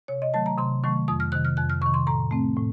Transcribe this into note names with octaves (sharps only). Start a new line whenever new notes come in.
C3 C#5
D#5
D#3 F#3 A3 A5
A#5
C3 C6
D#3 F#3 A3 C#6
F2 D#6
F6
C3 D#3 F#6
F6
F2 F#6
F6
C3 D#3 C#6
C6
A2 A#5
A3 C4
A2